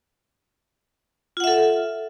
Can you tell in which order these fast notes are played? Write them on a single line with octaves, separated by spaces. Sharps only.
F4 F#5 E5 A4